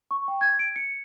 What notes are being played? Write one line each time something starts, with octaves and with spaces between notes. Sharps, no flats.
C#6
G5
G#6
D7
C#7